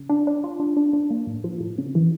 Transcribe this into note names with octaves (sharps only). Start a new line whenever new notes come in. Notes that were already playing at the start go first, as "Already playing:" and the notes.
Already playing: C#3
D4
D4
F4
D4
D4
D4
A#3
A2
F3
A2
C#3
E3